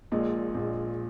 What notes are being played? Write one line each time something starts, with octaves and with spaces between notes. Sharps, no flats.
A#1 A#2 G#3 D#5
A#1 A#2 G#3